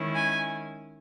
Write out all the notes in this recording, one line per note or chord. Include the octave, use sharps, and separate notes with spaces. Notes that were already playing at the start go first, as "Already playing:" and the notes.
Already playing: D#3 G#3 C#4 E4
G#5